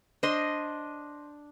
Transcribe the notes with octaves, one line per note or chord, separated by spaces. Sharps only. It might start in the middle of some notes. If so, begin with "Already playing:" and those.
D4 C5 D#5 C6